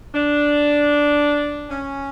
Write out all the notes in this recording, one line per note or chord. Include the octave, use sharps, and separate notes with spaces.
D4
C#4